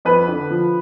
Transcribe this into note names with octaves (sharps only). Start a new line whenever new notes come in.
F2 B4
D3
F3